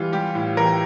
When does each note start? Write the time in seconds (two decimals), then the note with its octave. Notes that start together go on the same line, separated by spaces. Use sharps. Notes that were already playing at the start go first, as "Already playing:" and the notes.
Already playing: E3 G3 F4
0.12 G3 G4
0.35 A2
0.57 E3 A#4